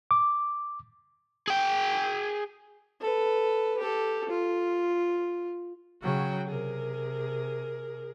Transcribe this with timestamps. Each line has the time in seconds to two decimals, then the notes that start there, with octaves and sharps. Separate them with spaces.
0.11 D6
1.47 G#4 G5
3.01 A4 B4
3.78 G4 A4
4.29 F4
6.02 C#3 F#3 F#4 G5
6.48 C3 G#4 A#4